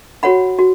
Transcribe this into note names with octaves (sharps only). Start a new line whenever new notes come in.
F#4 C#5 F#5 B5
F#4